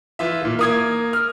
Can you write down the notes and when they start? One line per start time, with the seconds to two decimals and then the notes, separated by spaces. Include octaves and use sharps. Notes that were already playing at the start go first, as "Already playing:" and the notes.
0.19 E3 F4 E5
0.42 A#2 D#3
0.59 A#3 D#6 G#6
1.13 F6